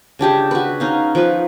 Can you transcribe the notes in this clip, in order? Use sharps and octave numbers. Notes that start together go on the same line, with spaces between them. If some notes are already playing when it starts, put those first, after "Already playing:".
C#3 D4 G4 G#4
F#4 B4
C#4 D#4 F5
F3 B4